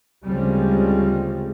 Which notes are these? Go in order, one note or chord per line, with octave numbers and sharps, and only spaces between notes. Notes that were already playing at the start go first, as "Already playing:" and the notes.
D2 C#3 F3 G3 G#3 C4